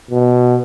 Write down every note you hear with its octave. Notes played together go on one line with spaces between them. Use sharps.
B2